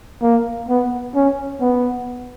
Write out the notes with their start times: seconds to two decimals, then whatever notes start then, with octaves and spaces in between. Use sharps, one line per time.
0.22 A#3
0.69 B3
1.15 C#4
1.61 B3